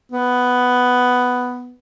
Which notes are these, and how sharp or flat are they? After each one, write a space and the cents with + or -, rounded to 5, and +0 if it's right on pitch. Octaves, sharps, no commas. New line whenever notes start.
B3 +5